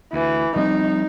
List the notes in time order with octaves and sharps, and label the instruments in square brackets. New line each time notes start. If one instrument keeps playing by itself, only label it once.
[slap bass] D2 [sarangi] E3
[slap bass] F3 G3 C4 [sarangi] D#4